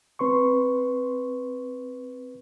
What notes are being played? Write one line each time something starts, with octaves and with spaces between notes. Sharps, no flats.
C4 B4 C6 C#6